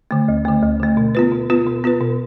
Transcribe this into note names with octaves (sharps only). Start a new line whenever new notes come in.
D3 A3
D2
D3 A3
D2
D3 A3
B2
B3 F4 B4
B2
B3 F4 B4
B2
B3 F4 B4
B2